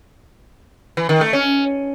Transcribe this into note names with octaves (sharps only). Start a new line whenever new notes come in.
E3
D#3
A3
C#4